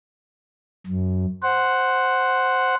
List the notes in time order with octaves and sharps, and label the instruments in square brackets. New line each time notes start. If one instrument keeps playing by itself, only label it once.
[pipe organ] F#2
C5 F#5